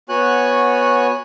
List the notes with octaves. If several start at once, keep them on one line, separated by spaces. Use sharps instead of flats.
B3 F#4 C#5 G#5 F#6